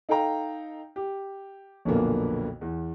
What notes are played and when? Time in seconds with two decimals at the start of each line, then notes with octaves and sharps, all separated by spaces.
0.09 D#4 A4 F5 G5 A#5
0.96 G4
1.85 B1 F2 A#2 D3 A#3 B3
2.61 E2